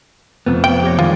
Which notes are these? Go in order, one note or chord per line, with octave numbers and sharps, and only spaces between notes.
F2 C3 A3 B3
G5
G4 C#5 D6 G#6 A#6
D#3 E3 G3 G#3 B3 F4 G#4